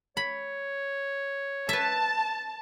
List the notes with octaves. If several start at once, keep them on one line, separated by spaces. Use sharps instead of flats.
C#5 B5
B4 E5 A5